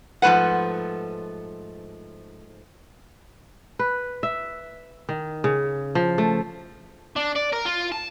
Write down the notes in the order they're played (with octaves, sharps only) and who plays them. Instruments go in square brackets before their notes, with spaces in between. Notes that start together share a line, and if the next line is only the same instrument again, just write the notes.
[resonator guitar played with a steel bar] G#2 F3 G#3 A3 B4 F#5
[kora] B4
E5
D#3
C#3
F3
A3
[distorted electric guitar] D4
D5
A#4
F4
A5